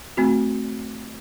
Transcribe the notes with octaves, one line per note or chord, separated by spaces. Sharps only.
A3 C4 F#4